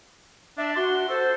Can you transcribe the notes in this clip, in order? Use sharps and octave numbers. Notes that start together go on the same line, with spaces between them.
D4 E5
F#4 C6
A4 C5